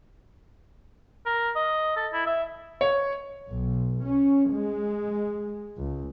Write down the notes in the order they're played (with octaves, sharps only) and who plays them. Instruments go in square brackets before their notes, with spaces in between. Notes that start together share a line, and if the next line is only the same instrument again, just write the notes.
[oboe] A#4
D#5
A4
E4
E5
[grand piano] C#5
[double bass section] B1
C#4
G#3
C#2